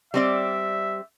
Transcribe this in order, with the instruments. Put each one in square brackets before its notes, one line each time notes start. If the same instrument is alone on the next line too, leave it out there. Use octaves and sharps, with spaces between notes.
[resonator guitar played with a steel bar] G3 C4 D5 [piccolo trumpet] E5